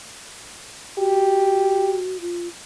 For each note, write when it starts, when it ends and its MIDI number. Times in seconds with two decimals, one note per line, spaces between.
0.98 2.18 66
0.98 1.98 67
2.21 2.48 65